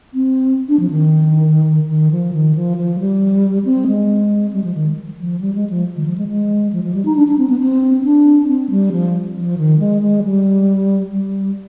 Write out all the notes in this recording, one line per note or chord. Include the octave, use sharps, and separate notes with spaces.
C4
D4
F3
D#3
D#3
F3
D#3
F3
F3
G3
C4
G#3
G3
F3
D#3
F3
G3
G#3
F3
D#3
F3
G#3
G#3
F3
F3
G3
D#4
D4
D4
C4
B3
C4
D4
C4
G3
F3
F3
D#3
G#3
G#3
G3
G3